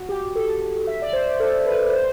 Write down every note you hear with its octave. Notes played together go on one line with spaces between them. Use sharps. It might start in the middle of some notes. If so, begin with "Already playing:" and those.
Already playing: F#4
G4
A4
E5
D5
C5
A4
B4
C5